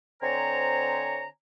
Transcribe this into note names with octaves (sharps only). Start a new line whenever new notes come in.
D3 C4 C5 C#5 G#5 A#5